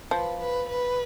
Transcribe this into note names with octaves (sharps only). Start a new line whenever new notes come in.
F3 B4
B4
B4